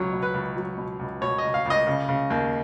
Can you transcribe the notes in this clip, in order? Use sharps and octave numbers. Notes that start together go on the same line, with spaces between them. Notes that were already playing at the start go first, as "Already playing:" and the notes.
Already playing: C#2 B2 F#3 C#5
B2
B4
C#2
F#3
B2
C#2
B2 C#5
D#5
C#2
F5
C#2 D#5
C#3
C#3
D#2